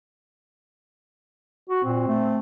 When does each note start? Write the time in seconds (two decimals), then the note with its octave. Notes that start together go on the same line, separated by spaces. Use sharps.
1.69 F#4
1.84 A#2 C4
2.08 A3